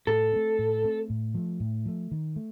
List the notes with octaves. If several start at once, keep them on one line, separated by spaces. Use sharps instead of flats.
A2 A4
A3 C4
A2
A3 C4
A2
F3 A3
A2
F3 A3
D#3
A3